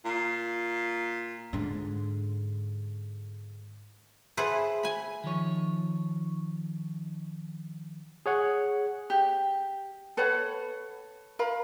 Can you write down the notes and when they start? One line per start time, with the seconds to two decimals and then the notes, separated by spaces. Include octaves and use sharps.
0.05 A#2
1.53 G#2 D3
4.37 E4 G#4 A4 B4 C5 F#5
4.83 G#5 B5
5.24 D#3 F3 C#5
8.26 G#4 C#5 F#5
9.10 G4
10.17 A4 B4 C#5 F#5
11.39 A#4 F5 B5